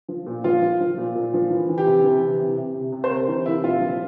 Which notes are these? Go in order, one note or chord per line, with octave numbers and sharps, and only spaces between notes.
F3
A#2
F3 F4
F3
F3
A#2
A#2
F3
E3
E3
G4
C3
E3
C3
C3
C3
C3
C3
C5
C3 A#4
E3
C3 E4
A#2 F4
F3